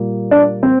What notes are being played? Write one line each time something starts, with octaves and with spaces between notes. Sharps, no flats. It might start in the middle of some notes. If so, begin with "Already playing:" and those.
Already playing: A#2 G3 A#3
D4 D5
C4 C5